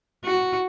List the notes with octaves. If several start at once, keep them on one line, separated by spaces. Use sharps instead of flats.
F#4